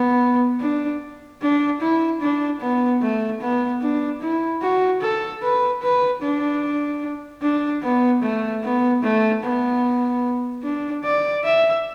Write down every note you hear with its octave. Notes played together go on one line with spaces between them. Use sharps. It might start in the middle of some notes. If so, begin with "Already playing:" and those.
Already playing: B3
D4
D4
E4
D4
B3
A3
B3
D4
E4
F#4
A4
B4
B4
D4
D4
B3
A3
B3
A3
B3
D4
D5
E5